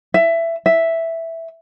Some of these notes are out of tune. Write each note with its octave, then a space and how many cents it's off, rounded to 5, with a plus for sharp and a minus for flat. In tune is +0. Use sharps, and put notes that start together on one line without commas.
E5 +15
E5 +0